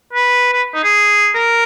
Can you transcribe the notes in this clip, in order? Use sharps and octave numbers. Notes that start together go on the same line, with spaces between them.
B4
B4
D#4
G#4
A#4